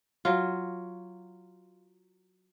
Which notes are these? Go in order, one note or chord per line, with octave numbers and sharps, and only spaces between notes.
F#3 F4